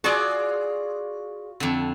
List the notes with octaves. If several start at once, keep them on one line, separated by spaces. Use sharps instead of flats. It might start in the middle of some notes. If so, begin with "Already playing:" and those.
F4 F#4 G#4 D5
F2 D3